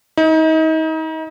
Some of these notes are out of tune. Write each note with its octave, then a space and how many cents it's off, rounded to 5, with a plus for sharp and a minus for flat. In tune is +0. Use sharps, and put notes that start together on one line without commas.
D#4 +35